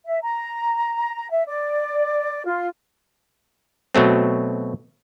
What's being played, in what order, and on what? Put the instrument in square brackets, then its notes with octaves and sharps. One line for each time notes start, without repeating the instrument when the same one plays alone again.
[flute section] E5
A#5
E5
D5
F4
[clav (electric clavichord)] B2 F#3 A3 C4